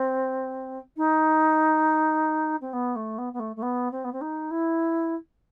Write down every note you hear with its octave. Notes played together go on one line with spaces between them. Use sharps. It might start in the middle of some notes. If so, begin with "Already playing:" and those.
Already playing: C4
D#4
C4
B3
A3
B3
B3
A3
A3
B3
C4
B3
C4
D#4
E4